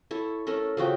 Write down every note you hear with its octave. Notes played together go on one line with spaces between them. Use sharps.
E4 A4 C#5
A3 C#4 A4 A#4
C#3 F3 F#4 G5